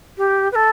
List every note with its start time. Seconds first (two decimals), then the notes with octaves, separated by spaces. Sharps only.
0.18 G4
0.52 B4
0.55 A4